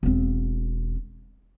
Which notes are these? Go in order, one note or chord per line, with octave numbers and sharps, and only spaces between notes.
E1 C4